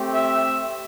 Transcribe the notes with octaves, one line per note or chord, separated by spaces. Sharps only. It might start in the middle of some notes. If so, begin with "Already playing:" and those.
Already playing: A3 C4 G4
E5